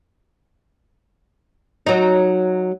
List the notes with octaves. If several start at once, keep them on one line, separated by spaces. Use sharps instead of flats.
F#3 D#4